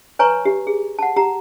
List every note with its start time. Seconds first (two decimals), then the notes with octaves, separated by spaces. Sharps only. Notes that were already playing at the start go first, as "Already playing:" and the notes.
0.19 B4 C#5 G#5 A#5 C#6
0.45 G4
0.67 G#4
0.99 F#5 A5
1.16 G4 A#5